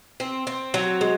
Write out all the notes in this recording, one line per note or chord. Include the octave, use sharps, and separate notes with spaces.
C4
C4
F#3
G#3